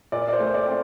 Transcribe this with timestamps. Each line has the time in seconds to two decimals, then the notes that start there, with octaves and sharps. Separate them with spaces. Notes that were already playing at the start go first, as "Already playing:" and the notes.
0.12 A#2 D5
0.28 D5
0.33 C5
0.40 A3
0.54 D5
0.67 C4